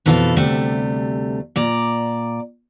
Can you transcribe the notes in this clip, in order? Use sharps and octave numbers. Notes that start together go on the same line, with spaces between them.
F2 B2 E3 A4 A#4 F5
D2 C3 G3 A3
A#2 D5 A#5